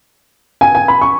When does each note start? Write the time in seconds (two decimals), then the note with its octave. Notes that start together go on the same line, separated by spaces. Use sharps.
0.61 G#5
0.75 G#5
0.88 B5
1.02 C#6